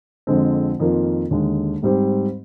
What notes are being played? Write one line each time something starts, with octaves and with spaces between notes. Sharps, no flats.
F2 D3 G#3 C4
F2 D#3 A#3 F4
D#2 D3 G#3
G#2 G3 C4 G4 C5